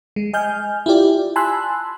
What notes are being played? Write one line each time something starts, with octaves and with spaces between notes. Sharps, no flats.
G#3
D#5 G#5 F6 G6
E4 F4 G4 D5
G#5 A5 B5 C6 E6 F#6